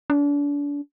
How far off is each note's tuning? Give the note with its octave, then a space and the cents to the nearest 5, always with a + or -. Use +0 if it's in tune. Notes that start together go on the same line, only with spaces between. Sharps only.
D4 -35